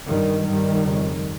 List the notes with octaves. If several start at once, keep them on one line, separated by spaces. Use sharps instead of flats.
G2 D#3 G3
G2 D#3 G3
F2 C#3